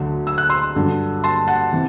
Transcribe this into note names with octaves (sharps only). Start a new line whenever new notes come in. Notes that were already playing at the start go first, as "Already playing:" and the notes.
Already playing: D2 D3 F#3
E6
F#6
C6 E6
G2 D3 F#3
A5 C6
F#5 A5
C3 E3